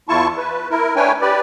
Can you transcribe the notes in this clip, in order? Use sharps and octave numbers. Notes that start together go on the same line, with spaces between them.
E2 E4 F4 A5 C#6
B4
E4 A#4
A3 D4 B4 C#5 G5 G#5
G4 B4 D5